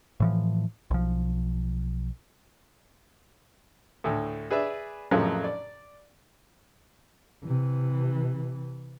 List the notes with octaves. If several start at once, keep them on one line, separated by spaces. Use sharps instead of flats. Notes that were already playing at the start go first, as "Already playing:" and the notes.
A2 E3 F3
B1 F3
D2 A2
G#4 B4 D5 E5
F2 A2 C#3 F3 F#3 A#3
D5
C3 E3